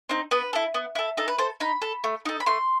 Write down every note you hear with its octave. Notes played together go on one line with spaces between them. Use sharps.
C4 D#4
B3 B4
E4 A4
B3
E4 A4
D#4 A4
B4
A4 C5
D#4 B5
A4
A3
D#4 A4
B5
A3 C6